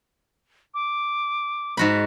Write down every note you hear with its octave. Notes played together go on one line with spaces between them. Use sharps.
D6
G#2 F#4 B5